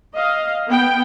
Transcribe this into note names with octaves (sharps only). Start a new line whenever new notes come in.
D#5 F5
B3 G5